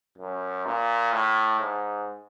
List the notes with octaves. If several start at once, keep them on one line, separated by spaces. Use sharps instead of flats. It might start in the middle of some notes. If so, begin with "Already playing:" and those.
F#2
A#2
A2
G#2